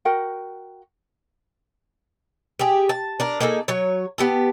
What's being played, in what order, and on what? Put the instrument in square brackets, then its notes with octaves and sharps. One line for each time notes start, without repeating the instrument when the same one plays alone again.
[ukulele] F#4 A#4 F#5 G5
[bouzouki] G4 G#4
A5
D4 A#4
A#3 D#4 G#4 A4
F#3 C#5
B3 G4 A4